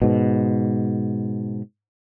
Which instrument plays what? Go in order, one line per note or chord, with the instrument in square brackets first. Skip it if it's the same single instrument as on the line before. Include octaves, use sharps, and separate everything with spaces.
[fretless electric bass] G#2 B2